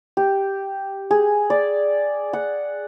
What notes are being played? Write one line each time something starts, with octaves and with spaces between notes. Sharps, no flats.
G4
G#4
D5
F#5